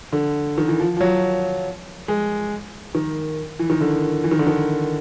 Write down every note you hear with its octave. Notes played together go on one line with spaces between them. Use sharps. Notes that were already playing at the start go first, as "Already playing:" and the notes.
D3
D#3
E3
F3
F3
F#3
G#3
D#3
E3
D#3
D3
E3
D#3
D3
D#3